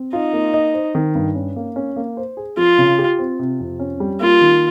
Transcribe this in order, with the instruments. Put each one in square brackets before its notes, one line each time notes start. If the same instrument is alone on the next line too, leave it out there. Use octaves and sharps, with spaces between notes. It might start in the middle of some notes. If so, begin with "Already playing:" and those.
Already playing: [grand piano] C4
[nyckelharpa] D#4 [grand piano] F4
[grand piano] A#3
D#5
C5
D#3
G2
C#4
A#3
C#4
A#3
C5
G#4
[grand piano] F3 [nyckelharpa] F4
[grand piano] C#3
G4
C4
C3
F2
C#4
G3
[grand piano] A#3 [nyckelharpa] F4
[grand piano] D#3